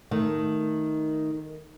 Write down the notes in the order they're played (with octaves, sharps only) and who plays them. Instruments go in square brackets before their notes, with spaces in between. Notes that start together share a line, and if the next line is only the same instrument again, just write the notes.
[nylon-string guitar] D#3 A3